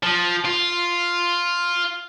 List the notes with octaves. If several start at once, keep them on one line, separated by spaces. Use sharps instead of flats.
F3
F4